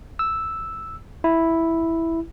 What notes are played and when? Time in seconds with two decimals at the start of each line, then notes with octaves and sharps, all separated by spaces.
0.19 E6
1.24 E4